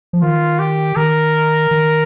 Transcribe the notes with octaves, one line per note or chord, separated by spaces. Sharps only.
F3
D#3 F4
G4
D#3 A#4
D#3